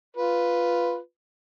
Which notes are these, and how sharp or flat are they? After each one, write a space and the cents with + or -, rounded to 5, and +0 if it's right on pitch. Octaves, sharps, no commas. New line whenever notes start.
F4 +0 B4 +0